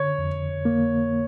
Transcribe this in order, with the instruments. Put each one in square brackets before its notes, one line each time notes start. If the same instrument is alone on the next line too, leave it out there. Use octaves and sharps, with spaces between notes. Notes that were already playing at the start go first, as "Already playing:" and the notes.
Already playing: [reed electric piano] D3 [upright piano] C#5
[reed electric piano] F2
A#3